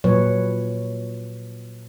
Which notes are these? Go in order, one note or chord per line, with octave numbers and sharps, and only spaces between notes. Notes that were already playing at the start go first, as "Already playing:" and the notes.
A#2 F#3 B4 C#5